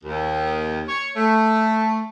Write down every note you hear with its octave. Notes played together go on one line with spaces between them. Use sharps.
D#2
C#5
A3